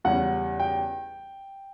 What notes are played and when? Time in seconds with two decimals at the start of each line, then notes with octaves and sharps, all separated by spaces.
0.05 E2 C#3 G3 C#4 F#5
0.60 G5